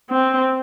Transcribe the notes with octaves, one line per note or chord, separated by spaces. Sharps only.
C4